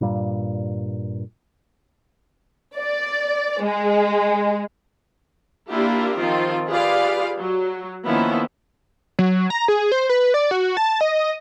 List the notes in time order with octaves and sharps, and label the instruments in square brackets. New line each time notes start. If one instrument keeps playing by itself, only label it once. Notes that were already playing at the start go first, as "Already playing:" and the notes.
[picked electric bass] G2 A#2 G3
[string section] D5
G#3
[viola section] A#3 D4 E4 F4 G4 A#4
D#3 F3 C4 F4
F4 G4 G#4 B4 D5 F5
F#3
D#3 F3 A#3 B3 C#4 E4
[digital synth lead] F#3
A#5
G#4
C5
B4
D5
F#4
A5
D#5